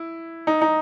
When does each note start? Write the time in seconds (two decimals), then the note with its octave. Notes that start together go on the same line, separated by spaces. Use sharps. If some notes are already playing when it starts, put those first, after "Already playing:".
Already playing: E4
0.47 D#4
0.62 D#4